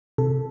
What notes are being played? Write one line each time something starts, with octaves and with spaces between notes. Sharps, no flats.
C3 A4